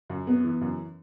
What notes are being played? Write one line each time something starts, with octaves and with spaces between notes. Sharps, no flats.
F#2
B3
E3
F#2